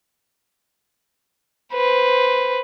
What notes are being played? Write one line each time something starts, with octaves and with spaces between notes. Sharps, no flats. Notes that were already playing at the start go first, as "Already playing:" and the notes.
B4 C5